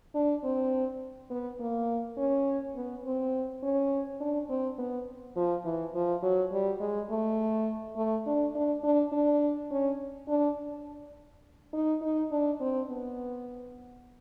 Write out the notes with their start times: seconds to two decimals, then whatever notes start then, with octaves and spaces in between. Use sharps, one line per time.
0.15 D4
0.44 C4
1.30 B3
1.60 A#3
2.18 C#4
2.75 B3
3.05 C4
3.63 C#4
4.20 D4
4.49 C4
4.78 B3
5.36 F3
5.65 E3
5.94 F3
6.23 F#3
6.52 G3
6.80 G#3
7.10 A3
7.96 A3
8.26 D4
8.55 D4
8.84 D4
9.12 D4
9.71 C#4
10.28 D4
11.74 D#4
12.02 D#4
12.32 D4
12.61 C4
12.89 B3